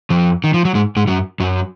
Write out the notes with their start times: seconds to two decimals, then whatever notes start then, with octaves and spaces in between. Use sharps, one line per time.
0.10 F2 F3
0.44 D#3
0.54 F3
0.65 F#3
0.75 G#2 G#3
0.96 G#2 G#3
1.08 F#2 F#3
1.40 F#2 F#3